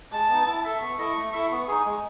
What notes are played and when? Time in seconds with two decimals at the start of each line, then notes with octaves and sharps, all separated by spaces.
0.12 G#3 A5
0.29 B3 D#4
0.46 E4
0.64 A4 E5
0.81 B3 C#6
0.99 E4 A4 D#5
1.16 A3
1.33 E4 A4 E5
1.51 B3
1.68 D#4 G#4
1.86 G#3